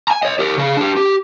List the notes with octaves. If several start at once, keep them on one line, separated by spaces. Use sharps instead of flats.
G#5 A#5
C#5 D#5
G4 A#4
C#3 G#4
D4 G4
G4